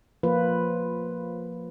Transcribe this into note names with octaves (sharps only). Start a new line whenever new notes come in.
F3 A#3 F4 B4